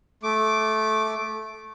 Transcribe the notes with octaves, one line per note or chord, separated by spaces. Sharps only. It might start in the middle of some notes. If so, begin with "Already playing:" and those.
A3 D6